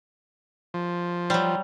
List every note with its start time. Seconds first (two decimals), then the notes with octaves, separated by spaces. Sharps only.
0.74 F3
1.30 F#3 G3